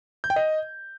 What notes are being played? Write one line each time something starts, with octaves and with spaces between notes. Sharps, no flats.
G6
G5
D#5